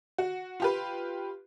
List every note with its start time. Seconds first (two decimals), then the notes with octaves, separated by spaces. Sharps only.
0.18 F#4
0.60 F4 G4 B4